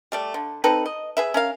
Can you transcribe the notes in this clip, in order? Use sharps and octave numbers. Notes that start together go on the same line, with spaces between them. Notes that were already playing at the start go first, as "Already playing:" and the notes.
G3 A3 D5
D3
C4 D#4 A4 B4
D#5
G#4 B4 E5
C#4 A#4 F5